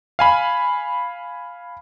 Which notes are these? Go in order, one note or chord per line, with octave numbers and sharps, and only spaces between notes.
F5 G#5 B5